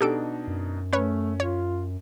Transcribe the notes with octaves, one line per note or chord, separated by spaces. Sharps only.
B2 D4 D#4 G4 A4 D7
F#2
A3 C#4 B4 C#5
F4 C#5